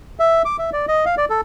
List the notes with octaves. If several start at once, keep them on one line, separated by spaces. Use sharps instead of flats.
E5
D6
E5
D5
D#5
F5
D5
A4